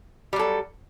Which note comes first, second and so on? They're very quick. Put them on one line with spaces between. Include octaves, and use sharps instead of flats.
G3 F#3 A4